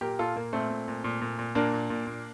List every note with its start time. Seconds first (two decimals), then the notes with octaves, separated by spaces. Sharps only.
0.01 A#2 G4 A#4
0.19 A#2 F4 A4
0.36 A#2 A#3
0.53 A#2 A3 C4
0.70 A#2
0.88 A#2
1.04 A#2
1.21 A#2
1.39 A#2
1.55 A#2 A#3 D4
1.73 A#2
1.90 A#2
2.07 A#2